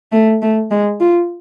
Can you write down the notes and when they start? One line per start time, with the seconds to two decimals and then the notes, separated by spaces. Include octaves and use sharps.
0.12 A3
0.42 A3
0.71 G#3
1.00 F4